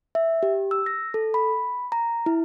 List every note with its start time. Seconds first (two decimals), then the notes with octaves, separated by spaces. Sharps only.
0.15 E5
0.43 G4
0.71 E6
0.86 A#6
1.14 A4
1.34 B5
1.92 A#5
2.26 E4